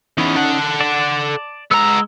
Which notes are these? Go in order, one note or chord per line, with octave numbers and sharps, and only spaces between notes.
E3 B3 C#4 D#4
A4 F#5
D5 A5
G#3 B3 A#5 E6